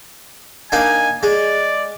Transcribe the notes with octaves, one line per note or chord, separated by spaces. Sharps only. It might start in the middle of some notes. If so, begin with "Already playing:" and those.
A#3 D4 D#4 G#5
G#3 D5